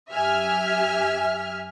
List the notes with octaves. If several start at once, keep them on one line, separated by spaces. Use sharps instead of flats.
F#2 G4 E5 G#5 F6